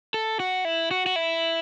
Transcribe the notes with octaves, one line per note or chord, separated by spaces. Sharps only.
A4
F#4
E4
F#4
F#4
E4